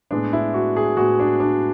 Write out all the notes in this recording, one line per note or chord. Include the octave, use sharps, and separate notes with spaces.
A2 G#3 B3 D4
E4
F#4
G#4
A2 G#3 B3 F#4
D4
D4